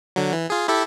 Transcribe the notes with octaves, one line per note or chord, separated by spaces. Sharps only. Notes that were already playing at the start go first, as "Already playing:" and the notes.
D3 F#3
E3
F4 G#4
E4 G4 A4